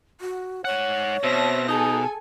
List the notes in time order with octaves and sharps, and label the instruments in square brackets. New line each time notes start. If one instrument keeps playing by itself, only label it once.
[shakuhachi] F#4
[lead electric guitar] G#2 F#5 [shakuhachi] C#5
[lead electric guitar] B2 [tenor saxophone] C4 [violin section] E5 A5 A#6
[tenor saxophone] D#4 [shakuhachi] G#4 [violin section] A4 G#5